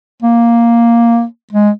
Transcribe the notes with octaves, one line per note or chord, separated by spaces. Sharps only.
A#3
G#3